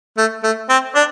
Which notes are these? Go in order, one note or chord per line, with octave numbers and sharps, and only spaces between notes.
A3
A3
C4
D4